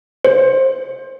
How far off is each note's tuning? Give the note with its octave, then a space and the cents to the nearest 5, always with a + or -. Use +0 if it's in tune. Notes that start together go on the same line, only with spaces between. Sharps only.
C5 +15